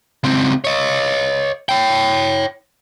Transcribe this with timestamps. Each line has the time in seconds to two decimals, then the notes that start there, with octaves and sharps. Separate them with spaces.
0.24 C#2 C4
0.64 C#5 D#5
1.69 C#5 G5